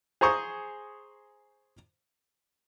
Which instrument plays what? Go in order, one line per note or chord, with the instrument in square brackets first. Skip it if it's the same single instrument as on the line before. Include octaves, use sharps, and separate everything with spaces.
[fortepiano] G#4 C5 A#5 C#6 D#6